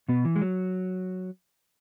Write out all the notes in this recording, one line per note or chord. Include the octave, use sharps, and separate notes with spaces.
B2 B3
E3
G#3
F#3